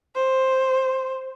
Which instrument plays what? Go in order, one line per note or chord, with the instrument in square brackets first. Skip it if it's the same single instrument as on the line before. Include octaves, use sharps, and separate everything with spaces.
[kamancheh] C5